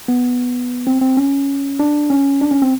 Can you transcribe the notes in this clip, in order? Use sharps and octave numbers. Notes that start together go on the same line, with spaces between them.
B3
C4
C4
C#4
D4
C#4
D4
C#4
C4